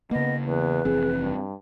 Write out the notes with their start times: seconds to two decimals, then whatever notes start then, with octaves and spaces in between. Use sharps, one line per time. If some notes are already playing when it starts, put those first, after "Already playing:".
0.11 C#3 A#3 B3 D#5
0.47 E2 B4
0.85 F1 E3 C4 G#4
1.22 G2